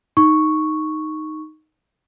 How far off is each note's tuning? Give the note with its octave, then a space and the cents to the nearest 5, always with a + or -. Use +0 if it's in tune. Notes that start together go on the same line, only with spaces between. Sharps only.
D#4 +0 C#6 +0